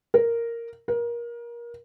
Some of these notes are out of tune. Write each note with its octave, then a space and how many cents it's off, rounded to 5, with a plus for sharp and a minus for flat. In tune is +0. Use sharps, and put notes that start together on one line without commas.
A#4 -5
A#4 +25